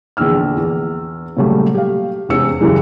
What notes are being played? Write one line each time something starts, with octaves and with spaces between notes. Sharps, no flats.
A#1 E2 D3 E6 F6
E2
A#2 C#3 F#3 G3 A3
G4 F5
E1 E2 C3 C#4 E6 C#7
C2 F#2 C#3 E3 G3 G#3